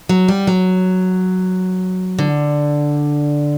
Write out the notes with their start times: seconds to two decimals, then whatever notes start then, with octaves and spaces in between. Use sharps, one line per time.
0.09 F#3
0.28 G3
0.47 F#3
2.19 D3